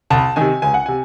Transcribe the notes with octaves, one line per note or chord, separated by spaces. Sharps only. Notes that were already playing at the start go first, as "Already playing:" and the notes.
C2 A5
C3 D#3 G#5
C#2 G#5
F#5
C3 G#5